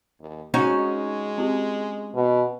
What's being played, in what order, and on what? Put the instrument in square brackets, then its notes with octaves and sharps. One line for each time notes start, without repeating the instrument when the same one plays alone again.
[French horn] D#2
[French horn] G#3 [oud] C#4 D#4 F#4
[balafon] C4 F4 G4
[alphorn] B2